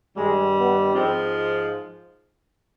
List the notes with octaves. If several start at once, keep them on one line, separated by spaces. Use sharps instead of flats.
G2 D#3 G3 G#3
B3
G#2 F3 G#3 C4